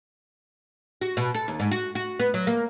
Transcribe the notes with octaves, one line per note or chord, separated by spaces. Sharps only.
F#4
B2
A4
D#2
G#2
F#4
F#4
B3
F#3
A#3